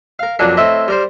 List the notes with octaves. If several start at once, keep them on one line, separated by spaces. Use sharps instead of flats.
A#4 F5
F2 A#2 F#3 C#4 D4
A2 C4 D#5 E5
G3 A#4 C5